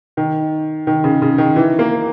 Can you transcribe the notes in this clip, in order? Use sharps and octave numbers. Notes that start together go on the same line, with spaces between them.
D#3
D#3
C#3
C#3
D#3
E3
A#3